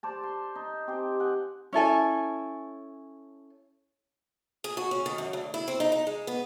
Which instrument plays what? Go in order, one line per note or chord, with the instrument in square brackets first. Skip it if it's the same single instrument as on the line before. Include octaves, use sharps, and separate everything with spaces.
[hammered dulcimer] C5 D5 A5
C6
D#4
C4 G4 C5 G#5
D#5 F#5 G#5
[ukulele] C#4 E4 A4 G#5
[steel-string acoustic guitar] G#4
F#4
C#4
D#3
F#2
D2
E4
C4
D#4
D#4
G#3
B3